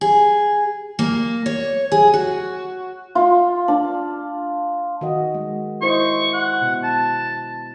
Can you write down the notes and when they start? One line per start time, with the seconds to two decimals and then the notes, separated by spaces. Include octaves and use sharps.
0.01 G#4
0.99 A#3
1.46 C#5
1.92 G#4
2.14 F#4
3.15 F4
3.68 D4
5.01 D#3 F#4 D#5
5.34 G#3
5.82 E4 C5 D#5 C#6
6.33 F#5
6.62 B2
6.83 A5